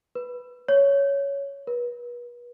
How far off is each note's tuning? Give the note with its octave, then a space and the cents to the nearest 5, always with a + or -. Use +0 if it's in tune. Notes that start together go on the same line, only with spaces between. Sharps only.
B4 +0
C#5 +10
B4 -35